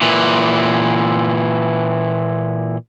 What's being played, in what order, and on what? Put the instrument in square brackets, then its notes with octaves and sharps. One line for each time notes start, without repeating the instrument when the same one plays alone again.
[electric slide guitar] A#2 E3